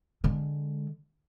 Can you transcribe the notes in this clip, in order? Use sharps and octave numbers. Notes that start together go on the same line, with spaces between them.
D3 G#3